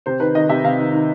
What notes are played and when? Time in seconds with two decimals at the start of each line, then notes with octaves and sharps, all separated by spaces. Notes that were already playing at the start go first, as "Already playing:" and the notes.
0.06 C3 C5
0.20 D#3 B4
0.35 D#3 D#5
0.49 C3 E5
0.64 C3 F5
0.79 D#3
0.92 D#3